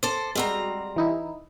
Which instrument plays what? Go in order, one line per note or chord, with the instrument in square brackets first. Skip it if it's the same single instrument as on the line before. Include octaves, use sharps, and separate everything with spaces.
[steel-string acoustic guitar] A4 C5 [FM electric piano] D6
[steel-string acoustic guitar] G3 C4 A#5 [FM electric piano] G#3 F#4
[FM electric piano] E3 D#4 E4